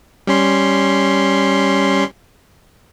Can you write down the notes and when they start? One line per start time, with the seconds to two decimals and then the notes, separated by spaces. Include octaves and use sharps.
0.27 G3 C#4 C6